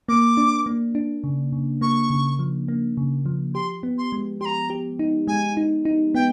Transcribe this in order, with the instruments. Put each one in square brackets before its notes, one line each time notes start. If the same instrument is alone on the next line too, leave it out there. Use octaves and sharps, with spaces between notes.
[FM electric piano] A#3 [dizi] D6
[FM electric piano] D4
A#3
D4
C#3
C#3
[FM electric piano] A#3 [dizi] C#6
[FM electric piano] C#3
F3
A#3
C#3
F3
[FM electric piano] G4 [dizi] C6
[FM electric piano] B3
[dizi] C6
[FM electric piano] G#3
[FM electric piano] G4 [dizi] C6
[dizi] A#5
[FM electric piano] G4
D#4
[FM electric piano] G#3 [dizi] G#5
[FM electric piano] D#4
D#4
[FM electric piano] B3 [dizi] G5